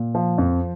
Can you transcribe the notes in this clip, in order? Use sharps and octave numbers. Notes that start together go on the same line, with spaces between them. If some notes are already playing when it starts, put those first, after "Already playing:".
Already playing: A#2
F3
F2